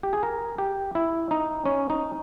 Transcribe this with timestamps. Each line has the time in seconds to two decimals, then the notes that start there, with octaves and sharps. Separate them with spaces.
0.03 G4
0.13 G#4
0.23 A#4
0.58 G4
0.95 E4
1.31 D#4
1.66 C#4
1.90 D#4